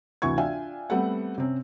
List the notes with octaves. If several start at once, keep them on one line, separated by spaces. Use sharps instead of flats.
D2 C3 E3 C#6 G#6
D4 F4 E5 F5 G5 G#5
G3 A3 B3 C4 F#5
C3 C4 C#4